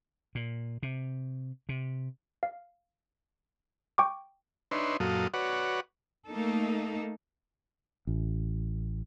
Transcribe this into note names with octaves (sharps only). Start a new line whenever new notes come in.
A#2
C3
C3
F5
G5 C#6 D6
D4 D#4 B4 C#5 E5 C6
F#2 A#2 F#3 A4 F5 D#6
F#4 B4 C#5 D5 F#5
A3 A#3 D#4 A4
A1